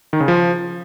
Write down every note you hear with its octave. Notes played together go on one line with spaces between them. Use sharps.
D#3
C#3
F3